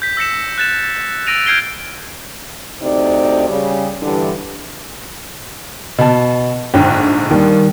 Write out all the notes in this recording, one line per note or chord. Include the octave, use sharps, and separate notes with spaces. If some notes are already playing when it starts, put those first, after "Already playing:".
G6 B6
E6 A#6 C#7 E7
F#6 A6 E7
E6 A6 A#6 D7 D#7 F7
F6 G6 G#6 C7 D7 G7
D2 C3 D#4 D5
C#3 G3
G2 D3 E3
B2 A5
A#1 G#2 D3 G5
D#2 D#3 G3